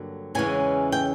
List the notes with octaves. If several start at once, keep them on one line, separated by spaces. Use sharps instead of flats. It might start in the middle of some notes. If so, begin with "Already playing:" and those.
Already playing: G2 D3 F#3 A#3
E2 C#3 E3 G#3 C#4 G#5
G5